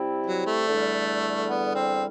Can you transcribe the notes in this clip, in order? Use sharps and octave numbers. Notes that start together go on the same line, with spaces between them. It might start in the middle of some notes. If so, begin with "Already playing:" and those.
Already playing: C3 G3 C4 E4
F#3
A3
E2 D3 G3
B3
C4